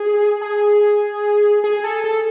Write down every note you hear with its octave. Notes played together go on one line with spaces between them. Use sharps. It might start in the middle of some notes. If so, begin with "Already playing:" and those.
Already playing: G#4
G#4
G#4
A4
A4